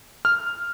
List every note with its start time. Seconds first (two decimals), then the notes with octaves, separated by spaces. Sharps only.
0.25 F6